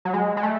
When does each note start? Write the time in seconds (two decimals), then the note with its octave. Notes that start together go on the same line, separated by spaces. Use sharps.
0.05 F#3
0.14 G#3
0.37 G#3
0.43 A3